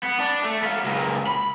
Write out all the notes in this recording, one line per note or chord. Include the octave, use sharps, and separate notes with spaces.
B3
D4
A3
B3 F5
C#2 A#2
B5